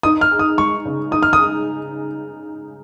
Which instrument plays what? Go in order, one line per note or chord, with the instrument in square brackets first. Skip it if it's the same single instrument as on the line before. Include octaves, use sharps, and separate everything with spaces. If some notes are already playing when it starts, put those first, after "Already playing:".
[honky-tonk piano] D#4 [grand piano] D#6
[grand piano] F6
[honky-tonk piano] G#4
[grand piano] D#6
[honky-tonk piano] G#3 [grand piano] C#6
[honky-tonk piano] C#3
[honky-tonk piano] D#4 [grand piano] D#6
[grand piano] F6
D#6
[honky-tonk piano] G#4